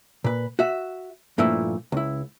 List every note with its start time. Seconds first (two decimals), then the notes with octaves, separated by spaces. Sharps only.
0.24 A#2 B4
0.59 F#4 E5
1.38 G2 A#2 F3 A3 E4
1.92 C#2 E4